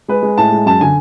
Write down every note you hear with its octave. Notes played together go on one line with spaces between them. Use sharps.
G#3 B4
G#3
A2 A5
G#3
F#2 A5
D3 G#5